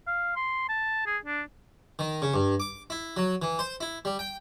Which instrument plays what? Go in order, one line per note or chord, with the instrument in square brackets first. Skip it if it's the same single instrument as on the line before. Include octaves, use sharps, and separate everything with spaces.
[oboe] F5
C6
A5
G#4
D4
[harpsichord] D#3
C#3
G2
D6
E4
F#3
E3
C5
E4
G3
G5